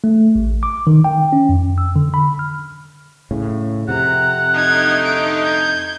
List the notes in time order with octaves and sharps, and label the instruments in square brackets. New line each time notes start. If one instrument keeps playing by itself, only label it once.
[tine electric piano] A3
A1
D6
D#3
G5
C#4
F2
E6
D3
B5
F6
[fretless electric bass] A2 C#3
[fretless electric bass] F2 C3 [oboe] F#5 [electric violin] A#5
[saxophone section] D3 A3 D#4 [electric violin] G#6
[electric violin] D7
G6 G#6